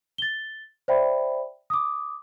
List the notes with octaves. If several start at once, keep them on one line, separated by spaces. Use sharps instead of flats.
A6 G7
C5 D5 E5 G5 B5
D6 D#6